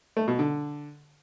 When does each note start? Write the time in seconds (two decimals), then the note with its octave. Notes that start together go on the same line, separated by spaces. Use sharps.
0.17 A3
0.28 B2
0.39 D3